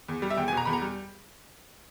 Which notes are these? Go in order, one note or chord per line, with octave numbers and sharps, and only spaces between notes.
E2
G3
E5
E2 G5
G#5
B2 A#5
E2 B5
A#5
G3